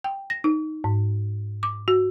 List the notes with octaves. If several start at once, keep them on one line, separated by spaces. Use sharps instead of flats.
G5
A#6
D#4
G#2
D6
F#4